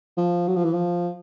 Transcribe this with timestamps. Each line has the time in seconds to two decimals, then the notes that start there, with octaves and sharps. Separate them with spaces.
0.18 F3
0.48 F#3
0.56 F3
0.65 E3
0.73 F3